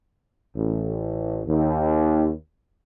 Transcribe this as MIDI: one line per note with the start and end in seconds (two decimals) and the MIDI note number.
0.56 1.42 33
1.47 2.30 39